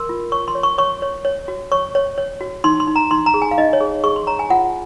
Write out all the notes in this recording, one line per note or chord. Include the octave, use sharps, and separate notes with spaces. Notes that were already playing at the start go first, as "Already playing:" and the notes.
Already playing: A#4 C6
F4
C#5 C#6
C6
C#5
C#6
C#5 C#6
C#5
C#5
F#4
C#5 C#6
C#5
C#5
F#4
D#4 C6
C6
D#4
A#5
D#4 C6
A#5
G#4
G#5
F5
D#4 D#5
C#5
G#4
G#4 C#6
C6
C#5 A#5
G#5
F4 F#5